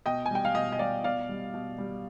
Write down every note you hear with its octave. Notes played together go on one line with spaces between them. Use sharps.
B2 D#5 G5
G#5
G3 G5
F5
B2 D#5
D#5
G3 D5 F5
B2 D5 F5
G3
B2
G3